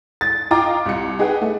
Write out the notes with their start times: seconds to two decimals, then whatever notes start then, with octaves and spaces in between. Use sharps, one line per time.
0.21 A6
0.51 F4 D#5 F5 G5 A#5 D6
0.86 C2 C#7
1.19 D#4 G#4 B4 F#5 G5
1.41 A3